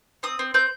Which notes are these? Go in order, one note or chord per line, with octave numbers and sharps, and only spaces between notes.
C4 D#6
C4
C4 G6